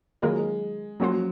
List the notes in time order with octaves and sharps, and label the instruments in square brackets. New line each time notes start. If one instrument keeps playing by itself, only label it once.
[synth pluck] D#3 F#3 A#3 F4 A#4 [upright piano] G#3
[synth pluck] F3 A#3 C#4 F#4 C5 [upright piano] F#3